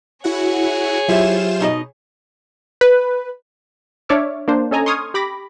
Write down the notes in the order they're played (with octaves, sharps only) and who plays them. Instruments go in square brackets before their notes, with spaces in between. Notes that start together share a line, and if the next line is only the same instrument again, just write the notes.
[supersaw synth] E4 F#4 F#5 [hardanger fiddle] G#4 C#5
[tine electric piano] F#3 G4 E5 [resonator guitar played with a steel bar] E4 [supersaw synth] F4 C5 E7
[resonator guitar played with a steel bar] B2 D#4 D#5
[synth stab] B4
[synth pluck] D4 C#5 D5 E5 D6 F6
A#3 D4 C5
C#4 A4 D#5 G#5 A#5
C6 C#6 D#6 F6 G#6
G4 B5 D6 A#6